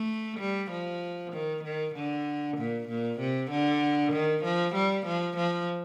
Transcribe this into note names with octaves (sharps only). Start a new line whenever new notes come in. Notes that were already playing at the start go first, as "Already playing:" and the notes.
Already playing: A3
G3
F3
D#3
D#3
D3
A#2
A#2
C3
D3
D#3
F3
G3
F3
F3